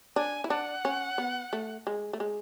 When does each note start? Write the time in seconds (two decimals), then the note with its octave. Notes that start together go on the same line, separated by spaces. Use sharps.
0.16 D4 G#5
0.44 E4
0.50 D4 F#5
0.85 C#4
1.18 B3
1.53 A3
1.87 G#3
2.13 A3
2.20 G#3